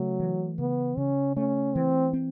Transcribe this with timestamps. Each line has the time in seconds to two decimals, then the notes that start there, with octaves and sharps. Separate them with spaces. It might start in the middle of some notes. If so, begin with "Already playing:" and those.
Already playing: C#3 F#3 A3
0.20 E3
0.58 C#3 B3
0.97 C#3 C#4
1.37 A3 C#4
1.75 E3 C4
2.13 C4